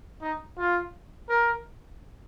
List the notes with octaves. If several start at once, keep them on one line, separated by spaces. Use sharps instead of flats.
D#4
F4
A#4